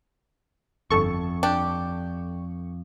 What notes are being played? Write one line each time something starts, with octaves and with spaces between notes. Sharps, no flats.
G1 F2 A4 C#6
D4 G4